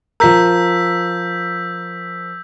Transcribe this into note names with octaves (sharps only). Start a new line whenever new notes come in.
F3 A#4 A#5 E6 G6 B6